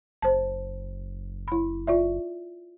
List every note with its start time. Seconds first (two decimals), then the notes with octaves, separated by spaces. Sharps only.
0.22 F#1 C5 A5
1.48 E4 B5
1.87 F4 D5 E5